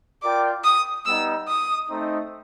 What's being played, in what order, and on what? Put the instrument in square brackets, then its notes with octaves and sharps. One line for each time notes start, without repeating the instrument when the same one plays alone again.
[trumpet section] F4 A#4 D5 G5 [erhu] D6
[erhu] D#6
[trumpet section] G3 B3 D#4 [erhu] E6
[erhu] D#6
[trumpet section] A3 C4 D#4